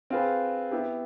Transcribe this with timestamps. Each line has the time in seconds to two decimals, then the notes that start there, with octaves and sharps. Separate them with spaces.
0.10 C4 F4 G#4 B4
0.71 B3 E4 G4